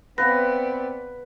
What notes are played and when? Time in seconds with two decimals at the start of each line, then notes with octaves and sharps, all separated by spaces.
0.18 B3 C4 B4 D5 F5 A#6